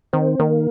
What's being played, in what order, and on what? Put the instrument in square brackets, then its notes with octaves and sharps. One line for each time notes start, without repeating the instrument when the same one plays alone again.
[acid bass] D#3 [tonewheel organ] C4
[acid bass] D#3 [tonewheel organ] A#3